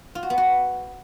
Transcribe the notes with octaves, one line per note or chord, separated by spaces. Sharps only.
F4
F#4
B3
F#4